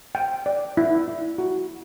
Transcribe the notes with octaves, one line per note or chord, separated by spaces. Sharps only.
G5
D5
E4
E4
F#4